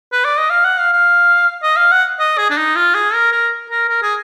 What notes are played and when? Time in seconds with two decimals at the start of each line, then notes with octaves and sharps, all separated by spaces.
0.12 B4
0.25 D5
0.37 D#5
0.50 F5
0.64 F#5
0.78 F5
0.93 F5
1.63 D#5
1.77 F5
1.92 F#5
2.19 D#5
2.38 G#4
2.50 D4
2.57 D#4
2.76 F4
2.94 G#4
3.14 A#4
3.32 A#4
3.70 A#4
3.89 A#4
4.02 G#4